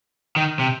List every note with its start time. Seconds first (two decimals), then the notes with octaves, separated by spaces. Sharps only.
0.36 D#3
0.59 C3